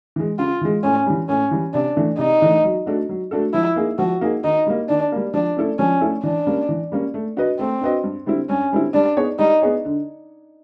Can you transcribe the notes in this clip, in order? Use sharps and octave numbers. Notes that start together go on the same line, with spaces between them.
E3 G#3
C#3 F4
E3 G#3
A2 C#4
E3 G3
A2 C#4
E3 G3
C3 D4
E3 A3 D4
C3 D#4
E3 A3 D4
F#3
A3 D4 F#4 A4
F#3
A3 D4 F#4 A4
F3 E4
A#3 D#4 G#4
F3 F#4
A#3 D#4 G#4
D#3 D#4
G3 A#3
D#3 D4
G3 A#3
F3 D4
A3 C#4 E4 A4
F3 C#4
A3 C#4 E4 A4
E3 D4
G3 A#3 C#4
E3
G3 A#3 C#4
A3
D4 F#4 B4 D#5
A3 C4
D4 F#4 B4 D#5
G2
D3 G3 C4 E4
G2 C#4
D3 G3 C4 E4
G3 D4
B3 D#4 G#4 C#5
G3 D#4
B3 D#4 G#4 C#5
D3